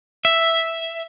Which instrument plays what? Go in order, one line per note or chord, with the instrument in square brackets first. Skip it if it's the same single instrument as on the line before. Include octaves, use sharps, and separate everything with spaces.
[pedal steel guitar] E5